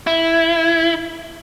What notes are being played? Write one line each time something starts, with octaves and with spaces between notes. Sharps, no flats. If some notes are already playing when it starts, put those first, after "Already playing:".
E4